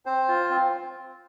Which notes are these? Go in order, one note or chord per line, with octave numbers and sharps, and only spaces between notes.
C4 C5
F4
C4